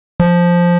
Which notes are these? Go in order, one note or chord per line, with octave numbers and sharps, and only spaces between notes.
F3